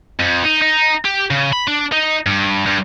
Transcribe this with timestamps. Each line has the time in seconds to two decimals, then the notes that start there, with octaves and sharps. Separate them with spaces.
0.20 F2
0.44 D#4
0.61 D#4
1.05 G4
1.31 C#3
1.53 B5
1.68 D4
1.93 D#4
2.26 G2
2.66 G2